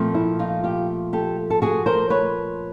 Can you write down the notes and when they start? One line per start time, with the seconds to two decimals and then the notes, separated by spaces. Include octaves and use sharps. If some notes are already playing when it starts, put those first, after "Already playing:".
Already playing: A#2 F3 A3 C4
0.15 E4
0.39 D#4 F4
0.64 F4 G4
1.13 G4 A4
1.50 A4
1.62 F#4 G#4
1.86 A#4 C5
2.10 B4 C#5